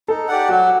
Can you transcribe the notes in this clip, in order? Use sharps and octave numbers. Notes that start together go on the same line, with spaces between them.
D#4 A4
G4 D5 F#5
F#3 F#4